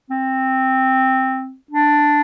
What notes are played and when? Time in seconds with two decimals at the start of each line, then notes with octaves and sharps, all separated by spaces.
0.10 C4
1.71 D4